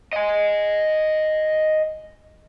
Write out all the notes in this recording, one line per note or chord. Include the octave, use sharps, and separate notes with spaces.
D#5 G#5